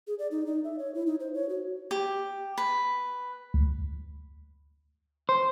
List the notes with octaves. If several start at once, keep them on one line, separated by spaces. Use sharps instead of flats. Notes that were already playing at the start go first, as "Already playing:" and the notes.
G#4
D5
D#4
D#4
E5
C#5
E4
D#4
C5
C#5
F#4
G4
B4
D2
C5